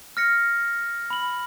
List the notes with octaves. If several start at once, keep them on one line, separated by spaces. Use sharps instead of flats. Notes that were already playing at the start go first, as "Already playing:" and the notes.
F6 A#6 C#7
B5 F#7